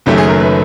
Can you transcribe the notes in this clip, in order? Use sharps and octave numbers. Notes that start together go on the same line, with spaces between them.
F#1 F#2 D#3 F#3 A3 G4
G#4
A#4
B4